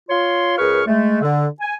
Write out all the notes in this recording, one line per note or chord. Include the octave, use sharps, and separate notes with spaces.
F4 C#5 C6
C#2 G#4 A#4 B4 C#6 F6
G#3 A3
D3
G#5